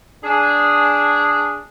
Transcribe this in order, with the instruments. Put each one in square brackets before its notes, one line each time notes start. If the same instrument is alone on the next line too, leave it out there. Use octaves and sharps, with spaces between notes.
[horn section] D4 G#4